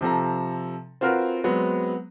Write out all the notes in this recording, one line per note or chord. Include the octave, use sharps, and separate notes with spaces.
C3 F3 A4 A#5
C4 F4 F#4 A#4 B4
F#3 G#3 B3 C4